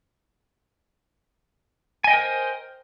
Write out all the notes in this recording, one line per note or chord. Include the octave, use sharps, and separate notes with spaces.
A#4 C5 D#5 G5 G#5